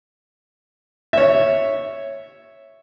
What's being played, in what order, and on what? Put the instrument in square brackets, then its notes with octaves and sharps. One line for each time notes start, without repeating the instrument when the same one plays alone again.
[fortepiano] C#5 E5